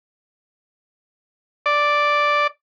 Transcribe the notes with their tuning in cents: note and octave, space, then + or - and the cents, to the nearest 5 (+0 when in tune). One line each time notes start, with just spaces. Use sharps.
D5 +0